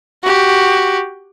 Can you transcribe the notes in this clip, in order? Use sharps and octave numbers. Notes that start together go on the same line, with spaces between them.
F#4 G4